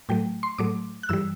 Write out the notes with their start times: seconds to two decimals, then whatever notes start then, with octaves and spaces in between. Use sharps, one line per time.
0.09 A2 F#3 A3 G5
0.43 C6
0.58 A2 F#3 A3 D6
1.03 F#6
1.09 G2 E3 G3 E6